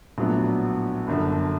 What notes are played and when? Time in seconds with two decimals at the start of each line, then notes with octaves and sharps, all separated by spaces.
0.18 A#1 A2 F#3 B3 D4
1.07 G1 F#2 D3